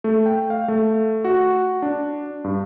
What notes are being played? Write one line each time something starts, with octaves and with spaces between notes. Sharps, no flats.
A3
G5
F5
A3
F#4
D4
G2